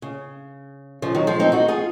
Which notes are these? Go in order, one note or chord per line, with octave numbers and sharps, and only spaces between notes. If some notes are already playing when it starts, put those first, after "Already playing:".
C#3
C#3 F3
D#3 F#3
F3 G#3
C4 D#4
D#4 F#4
F4 G#4